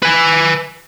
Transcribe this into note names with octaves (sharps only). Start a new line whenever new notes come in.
B4 G#5